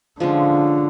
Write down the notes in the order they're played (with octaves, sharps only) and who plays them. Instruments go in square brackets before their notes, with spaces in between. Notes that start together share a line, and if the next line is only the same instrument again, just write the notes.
[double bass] D3 [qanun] F3 G#3 C#4